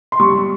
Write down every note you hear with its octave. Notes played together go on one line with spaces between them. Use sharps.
C6
G3 C#6